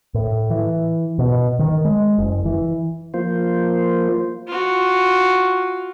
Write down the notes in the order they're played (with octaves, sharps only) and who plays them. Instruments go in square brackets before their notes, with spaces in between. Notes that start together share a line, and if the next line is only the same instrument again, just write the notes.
[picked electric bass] A2
E3
B2
D#3
G#3
F#1
E3
[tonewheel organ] F3 A#3 F4 C5
[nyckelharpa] F4 F#4